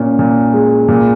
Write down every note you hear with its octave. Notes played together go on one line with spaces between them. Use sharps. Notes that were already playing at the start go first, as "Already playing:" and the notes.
Already playing: A#2 C#4
A#2
G#3
A#2